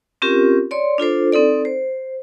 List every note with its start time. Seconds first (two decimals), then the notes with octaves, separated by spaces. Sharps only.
0.22 C4 C#4 F4 G4 A#4
0.71 C#5 D5 C6
0.98 D4 F4 A4 C5
1.32 C4 D#4 A4 D5
1.65 C5